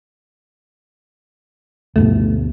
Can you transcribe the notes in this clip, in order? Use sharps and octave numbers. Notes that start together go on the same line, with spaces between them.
D2 G2 B2 A3